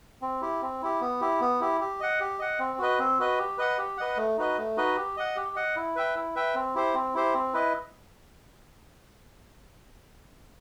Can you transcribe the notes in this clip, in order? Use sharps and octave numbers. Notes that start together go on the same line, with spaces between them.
C4
E4 G4
C4
E4 G4
B3
E4 G4
B3
E4 G4
G4
D#5 F#5
G4
D#5 F#5
C4
F#4 B4 D#5
C4
F#4 B4 D#5
G4
B4 D#5 F#5
G4
B4 D#5 F#5
A3
D#4 F#4 B4 D#5
A3
D#4 F#4 B4 D#5
G4
D#5 F#5
G4
D#5 F#5
E4
B4 E5 G5
E4
B4 E5 G5
C4
E4 G4 C5
C4
E4 G4 C5
C4
E4 B4 D#5